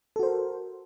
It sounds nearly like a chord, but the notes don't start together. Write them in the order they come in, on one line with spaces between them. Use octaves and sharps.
A4 F#4 C5 A#4